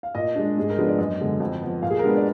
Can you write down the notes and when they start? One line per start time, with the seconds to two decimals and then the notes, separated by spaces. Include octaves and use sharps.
0.03 F5
0.15 A#2 D#5
0.35 G#3 D4
0.57 G#2 G#4
0.70 A#4
0.78 F3 G#3 B3 D4 B4
0.88 D5
0.99 F#2 D#5
1.20 D3 G#3 B3
1.40 F2
1.62 F3 B3
1.82 A#2 F5
1.91 G#4
1.99 A#4
2.04 G#3 B3 D4 B4
2.16 D5